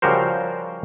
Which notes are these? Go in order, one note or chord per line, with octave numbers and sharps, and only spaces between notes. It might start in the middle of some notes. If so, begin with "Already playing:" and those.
C#3 F3 G3 F#4 A#4 C5